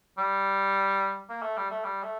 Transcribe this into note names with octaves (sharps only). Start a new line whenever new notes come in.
G3
A#3
A3
G3
A3
G3
A3